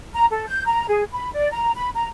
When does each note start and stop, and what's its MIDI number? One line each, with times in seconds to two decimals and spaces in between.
0.14 0.25 82
0.30 0.45 69
0.47 0.64 91
0.66 0.86 82
0.88 1.04 68
1.13 1.31 83
1.33 1.50 74
1.51 1.72 82
1.76 1.89 83
1.94 2.08 82